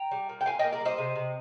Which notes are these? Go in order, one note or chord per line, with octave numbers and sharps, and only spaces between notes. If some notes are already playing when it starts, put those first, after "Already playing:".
Already playing: G5 A#5
G3
A#2
G5
A#2 F5 G#5
D#5 G5
A#3
A#4 D5
G3 C5 D#5
C3
C3